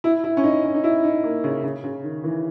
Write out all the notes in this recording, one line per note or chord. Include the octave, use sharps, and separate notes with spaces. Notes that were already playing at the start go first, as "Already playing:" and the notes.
E4
E4
C#4
D#4
C#4
D#4
E4
D#4
A#3
C#3
C#3
C#3
D#3
E3